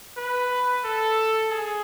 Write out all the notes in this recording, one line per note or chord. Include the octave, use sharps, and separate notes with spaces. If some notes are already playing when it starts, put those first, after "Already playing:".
B4
A4
G#4